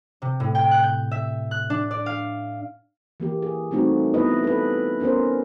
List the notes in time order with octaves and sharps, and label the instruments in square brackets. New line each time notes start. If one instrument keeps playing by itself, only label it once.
[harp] C3
A2
G5
F#6
G6
E5
F#6
D4
D5
F5
[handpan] E3 A#3 G4
G#4
G3 A3 C4 D#4 F#4
B3 E4 B4 D#5
A4 B4
B3 C#4 D4 A#4 C5